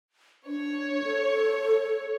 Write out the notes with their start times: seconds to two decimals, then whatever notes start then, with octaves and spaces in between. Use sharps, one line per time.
0.47 D4 C#5
1.04 A4